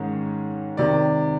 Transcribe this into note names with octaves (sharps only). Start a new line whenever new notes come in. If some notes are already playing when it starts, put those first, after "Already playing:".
Already playing: G#2 D#3 G#3 C#4
C3 D#3 D5